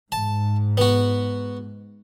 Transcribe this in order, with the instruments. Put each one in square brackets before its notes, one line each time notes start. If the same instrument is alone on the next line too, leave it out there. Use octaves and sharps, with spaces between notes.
[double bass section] G#2 [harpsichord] A5
[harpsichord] B3 F#4